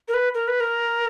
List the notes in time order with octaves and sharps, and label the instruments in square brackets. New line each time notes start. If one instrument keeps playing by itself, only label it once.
[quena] A#4
B4
A#4
B4
A#4